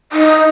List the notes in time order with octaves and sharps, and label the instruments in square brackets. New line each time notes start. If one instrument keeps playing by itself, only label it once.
[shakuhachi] D#4